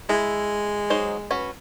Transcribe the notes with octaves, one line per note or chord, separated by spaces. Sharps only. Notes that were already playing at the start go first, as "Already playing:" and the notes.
G#3 E4
F#3 D#4 C5
C#4 F#4 B4